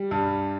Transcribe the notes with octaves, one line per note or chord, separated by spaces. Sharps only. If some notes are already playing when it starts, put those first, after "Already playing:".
Already playing: G3
G2